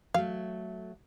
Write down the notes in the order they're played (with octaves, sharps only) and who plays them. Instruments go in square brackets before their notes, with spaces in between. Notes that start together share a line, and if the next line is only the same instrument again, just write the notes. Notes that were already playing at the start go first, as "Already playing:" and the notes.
[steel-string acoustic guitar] F#3 A3 [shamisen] F5